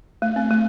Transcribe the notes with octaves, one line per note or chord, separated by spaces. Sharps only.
A3
C4
A3